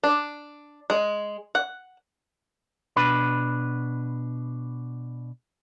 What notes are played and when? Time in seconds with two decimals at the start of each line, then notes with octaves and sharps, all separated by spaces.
0.04 D4
0.90 G#3
1.55 F#5
2.96 B2 D4 B4 B5